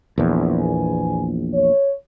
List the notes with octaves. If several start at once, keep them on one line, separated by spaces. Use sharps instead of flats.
A#1 E2
A#2 B3 G#5
C#5